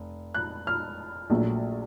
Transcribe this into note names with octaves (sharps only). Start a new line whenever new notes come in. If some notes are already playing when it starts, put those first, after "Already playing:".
Already playing: F1
F#6
F6
A#1 A#2 F#3 A3